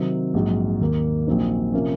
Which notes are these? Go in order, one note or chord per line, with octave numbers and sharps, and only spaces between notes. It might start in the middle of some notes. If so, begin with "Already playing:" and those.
Already playing: C3 D#3 F#3 C4
A#1 G#2 F#3
D#2 D#3 A#3
A#1 A#2 F#3 C4 D#4
C3 F3 A#3 C#4